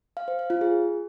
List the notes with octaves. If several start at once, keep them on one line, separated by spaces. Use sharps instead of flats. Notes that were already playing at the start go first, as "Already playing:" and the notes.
F5
C5
F5
F4
G#4